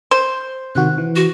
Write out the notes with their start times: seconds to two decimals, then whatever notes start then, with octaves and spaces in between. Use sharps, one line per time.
0.11 C5
0.75 C3 D#3 F#4 F#6
0.98 E3
1.16 F#4